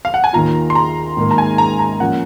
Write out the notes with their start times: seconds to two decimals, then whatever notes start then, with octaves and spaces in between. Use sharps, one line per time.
0.05 F5
0.14 F#5
0.24 G#5
0.33 D#2 D#3 A#3 F4 A#5
0.70 C6
0.75 A#5
1.17 G#2 D#3 A#3
1.31 A#5
1.38 G#5
1.58 A#5
1.79 A#5
2.00 F3 A#3 C#4 F#5